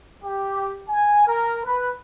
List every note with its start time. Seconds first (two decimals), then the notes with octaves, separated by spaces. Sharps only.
0.24 G4
0.90 G#5
1.27 A#4
1.65 B4